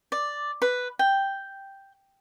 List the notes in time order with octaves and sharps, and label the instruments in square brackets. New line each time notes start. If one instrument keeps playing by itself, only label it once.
[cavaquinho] D5
B4
G5